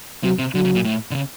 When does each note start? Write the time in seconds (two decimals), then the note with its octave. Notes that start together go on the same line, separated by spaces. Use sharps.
0.24 C3 F#3
0.39 C3
0.54 D3 F#3
0.65 C#3
0.75 A#2
0.84 A2
1.11 D3
1.15 C#3